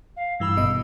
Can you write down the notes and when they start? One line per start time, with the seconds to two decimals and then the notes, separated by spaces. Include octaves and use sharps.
0.16 F5
0.40 G2 E3 B5 E6
0.56 G#1 B2 D#5